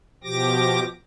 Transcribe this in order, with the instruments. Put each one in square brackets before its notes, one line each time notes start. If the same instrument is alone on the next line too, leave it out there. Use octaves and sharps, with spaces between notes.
[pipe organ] B2 F3 G4 D6 A#6